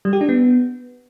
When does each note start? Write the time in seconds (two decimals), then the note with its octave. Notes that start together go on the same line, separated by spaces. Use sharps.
0.05 G3
0.13 G4
0.21 D4
0.29 B3